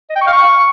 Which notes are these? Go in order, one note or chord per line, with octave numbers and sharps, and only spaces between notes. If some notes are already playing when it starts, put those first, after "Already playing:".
D#5
G5
C#6
F5
C#6